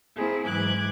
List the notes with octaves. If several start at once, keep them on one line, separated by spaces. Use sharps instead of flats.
A#3 C4 E4 G#4
G#2 E3 F#3 D6 F#6 G#6